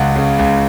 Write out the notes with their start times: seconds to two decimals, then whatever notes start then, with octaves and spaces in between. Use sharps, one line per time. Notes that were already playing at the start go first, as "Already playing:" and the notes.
Already playing: C#2 F#5
0.16 C#3
0.39 C#2